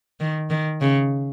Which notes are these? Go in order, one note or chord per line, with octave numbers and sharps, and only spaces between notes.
D#3
D#3
C#3